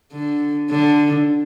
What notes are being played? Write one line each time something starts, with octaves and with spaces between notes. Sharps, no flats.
D3
D3